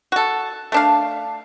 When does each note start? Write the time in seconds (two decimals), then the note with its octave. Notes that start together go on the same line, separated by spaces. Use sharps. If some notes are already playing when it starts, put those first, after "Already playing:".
0.12 F#4 A4
0.72 A3 D4 F5